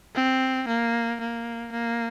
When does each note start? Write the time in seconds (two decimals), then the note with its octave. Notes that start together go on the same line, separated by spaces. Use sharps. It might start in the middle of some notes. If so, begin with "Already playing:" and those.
0.15 C4
0.68 A#3
1.20 A#3
1.72 A#3